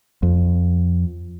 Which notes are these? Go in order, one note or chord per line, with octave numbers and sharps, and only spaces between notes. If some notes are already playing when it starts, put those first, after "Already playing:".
F2